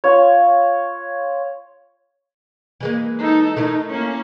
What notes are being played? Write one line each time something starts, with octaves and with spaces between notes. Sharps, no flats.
F4 C#5
E3 G#3 A#3
D#4 A4
A3 D#4 E4 A#4
A#3 C#4